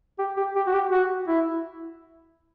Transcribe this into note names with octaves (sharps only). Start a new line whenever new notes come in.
G4
G4
G4
F#4
G4
F#4
E4